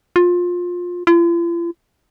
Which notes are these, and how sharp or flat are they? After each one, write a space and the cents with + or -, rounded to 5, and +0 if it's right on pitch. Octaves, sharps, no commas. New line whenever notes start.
F4 +20
F4 -45